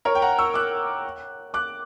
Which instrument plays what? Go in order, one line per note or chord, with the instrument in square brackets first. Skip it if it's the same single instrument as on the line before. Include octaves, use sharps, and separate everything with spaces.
[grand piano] A#4 C#5
G5
F#5 A#5
C#6 E6
D6 F#6
D6 F#6